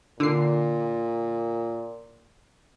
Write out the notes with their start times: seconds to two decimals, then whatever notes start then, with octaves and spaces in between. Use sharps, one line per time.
0.20 A#2 D3 C7